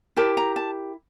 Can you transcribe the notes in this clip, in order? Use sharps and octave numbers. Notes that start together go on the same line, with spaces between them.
E4 G4 A#4 A5
A#5
A5